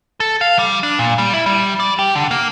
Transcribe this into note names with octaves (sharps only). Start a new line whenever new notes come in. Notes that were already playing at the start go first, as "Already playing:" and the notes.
A4
F5
G3
D4
A#2
G3
E4
G3
D5
G4
D3
A#3